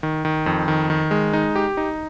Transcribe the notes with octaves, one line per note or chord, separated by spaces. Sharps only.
D#3
D#3
F2
D#3
D#3
G#3
D#4
G4
D#4